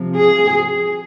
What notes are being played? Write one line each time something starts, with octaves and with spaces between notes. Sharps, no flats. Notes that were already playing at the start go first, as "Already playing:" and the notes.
Already playing: C3 F3
G#4